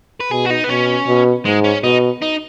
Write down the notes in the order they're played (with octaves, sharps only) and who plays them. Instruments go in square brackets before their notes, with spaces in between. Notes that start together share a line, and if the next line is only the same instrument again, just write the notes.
[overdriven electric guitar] B4
[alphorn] B2 [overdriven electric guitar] G#4
[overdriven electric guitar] F#4
D#4
B3
[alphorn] B2 [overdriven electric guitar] C#4
[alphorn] B2
[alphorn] G#2 [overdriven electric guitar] G#3
[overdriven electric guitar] C#4
[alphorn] B2 [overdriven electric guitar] D#4
[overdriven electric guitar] D#4